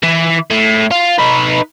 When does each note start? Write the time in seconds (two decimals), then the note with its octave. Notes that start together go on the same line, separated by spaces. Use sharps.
0.03 E3
0.51 A2
0.91 F4
1.18 D#4 B4